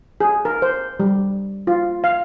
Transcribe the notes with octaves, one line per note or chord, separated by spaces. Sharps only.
G#4
A#4
C5
G3
F4
F5